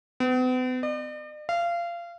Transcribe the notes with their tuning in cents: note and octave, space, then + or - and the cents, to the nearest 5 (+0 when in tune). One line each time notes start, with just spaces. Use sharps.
B3 +45
D5 +45
F5 -25